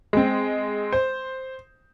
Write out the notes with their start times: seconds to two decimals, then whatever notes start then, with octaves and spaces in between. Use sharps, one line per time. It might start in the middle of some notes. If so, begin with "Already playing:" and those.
0.13 G#3 C4
0.92 C5